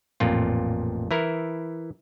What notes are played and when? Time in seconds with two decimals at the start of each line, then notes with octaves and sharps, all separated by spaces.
0.20 A1 F2 A#2 F4
1.11 E3 E4 A#4